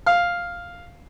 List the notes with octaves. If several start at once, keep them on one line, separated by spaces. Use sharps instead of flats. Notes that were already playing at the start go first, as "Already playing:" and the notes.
F5